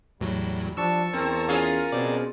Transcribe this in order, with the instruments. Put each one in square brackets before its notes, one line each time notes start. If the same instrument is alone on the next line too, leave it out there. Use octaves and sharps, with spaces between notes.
[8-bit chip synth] E2 A2 F#3 [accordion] G3
[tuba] F3 [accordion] G3 D4 [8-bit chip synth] A5 C#6 E6
[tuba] E2 [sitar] C4 [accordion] A#4
[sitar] C#4 F4 G#4
[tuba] B2 [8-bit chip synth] C4 D5